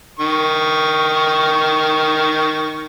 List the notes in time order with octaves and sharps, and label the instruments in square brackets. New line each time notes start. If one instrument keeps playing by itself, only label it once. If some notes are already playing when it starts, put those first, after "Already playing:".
[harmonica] D#3 C#6